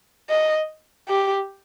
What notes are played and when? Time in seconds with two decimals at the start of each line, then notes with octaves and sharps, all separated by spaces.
0.30 D#5
1.08 G4